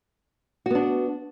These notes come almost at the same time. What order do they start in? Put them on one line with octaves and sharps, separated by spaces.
F#4 B3 D4